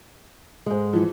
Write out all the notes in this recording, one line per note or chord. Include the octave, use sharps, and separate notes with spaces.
G#2 G#3
E3 F3